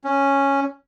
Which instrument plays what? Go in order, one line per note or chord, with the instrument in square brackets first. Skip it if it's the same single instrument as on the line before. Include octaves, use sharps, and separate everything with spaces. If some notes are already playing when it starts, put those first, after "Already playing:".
[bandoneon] C#4